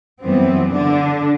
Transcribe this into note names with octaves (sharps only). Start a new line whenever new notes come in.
F#2 E3 G3 B3 C4
D3 D4